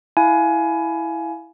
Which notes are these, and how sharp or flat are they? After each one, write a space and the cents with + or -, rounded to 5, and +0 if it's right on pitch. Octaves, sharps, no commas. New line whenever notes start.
E4 +0 F5 +0 G#5 +20